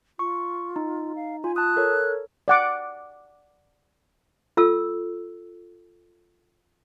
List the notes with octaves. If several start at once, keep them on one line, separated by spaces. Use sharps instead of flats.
F4 C#6
D#4
F5
F4 G#5
A5 D#6 F#6
A4 A#4 C#5
D5 F#5 D6
F4 A4 E6